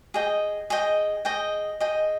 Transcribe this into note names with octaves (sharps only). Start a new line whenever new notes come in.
G#4 D#5 G5
G#4 D#5 G5
G#4 D#5 G5
G#4 D#5 G5